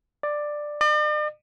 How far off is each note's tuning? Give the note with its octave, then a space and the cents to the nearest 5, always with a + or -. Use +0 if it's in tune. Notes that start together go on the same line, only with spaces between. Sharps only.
D5 +10
D5 +45